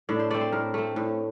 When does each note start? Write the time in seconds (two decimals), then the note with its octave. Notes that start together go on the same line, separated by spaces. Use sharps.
0.09 A2 D4
0.19 C5
0.30 A3 C4 D5
0.41 C5
0.52 A2 A#4
0.74 A3 C4
0.96 A2